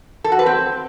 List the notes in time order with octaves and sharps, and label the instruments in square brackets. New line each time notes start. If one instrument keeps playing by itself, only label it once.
[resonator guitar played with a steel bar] A4
F#4
B4
C4